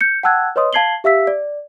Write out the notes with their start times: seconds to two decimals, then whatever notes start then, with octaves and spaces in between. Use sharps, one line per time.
0.01 G6 C#7
0.23 F#5 G5 A5 E6 F#6 G#6
0.56 B4 C#5 D#5 C6 D#6
0.73 F5 A5 G#6 C7 F#7 G7
1.04 G4 E5 F5 E6 B6
1.27 D5